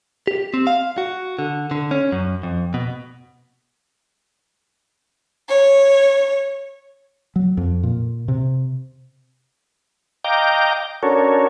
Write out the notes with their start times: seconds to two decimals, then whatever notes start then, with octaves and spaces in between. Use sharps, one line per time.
0.27 G4
0.54 C4
0.67 F5
0.98 F#4
1.39 D3
1.71 D3
1.91 C#4
2.12 F#2
2.43 F2
2.74 B2
5.47 C#5
7.36 F#3
7.57 F2
7.83 A#2
8.28 C3
10.24 D#5 F5 G5 A#5 D6 G6
11.03 C#4 D4 F#4 A4 A#4 C#5